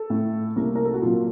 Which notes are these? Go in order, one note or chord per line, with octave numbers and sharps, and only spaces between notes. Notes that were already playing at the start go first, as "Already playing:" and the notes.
Already playing: A4
A2 A3
C2 A#3 A#4
A#4
A4
F#4
A#2 F#3 A#3 F4